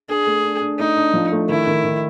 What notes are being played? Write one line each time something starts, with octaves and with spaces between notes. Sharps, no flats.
D4 G#4
A3
D4
D4
A3 D#4
D4
F3
A3
D#3 E4
D#3
D#3